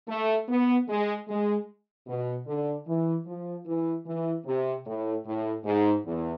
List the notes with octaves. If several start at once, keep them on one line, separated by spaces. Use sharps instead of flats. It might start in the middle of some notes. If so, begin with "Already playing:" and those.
A3
B3
G#3
G#3
B2
D3
E3
F3
E3
E3
C3
A2
A2
G#2
E2